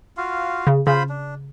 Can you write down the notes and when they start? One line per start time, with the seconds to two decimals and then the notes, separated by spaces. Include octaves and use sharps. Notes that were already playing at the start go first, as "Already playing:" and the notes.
0.17 F4 F#4 F5
0.67 C#3
0.87 C#3 F4 C5 B5
1.09 D4